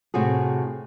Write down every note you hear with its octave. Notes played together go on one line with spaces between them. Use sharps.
A2 C3 F#4 G#4